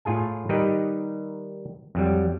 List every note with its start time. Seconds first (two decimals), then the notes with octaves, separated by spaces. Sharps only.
0.05 A2 F4 G#4 G#5
0.49 D#3 G3 D#4 G4 B4 D#5
1.95 F2 F#3 G3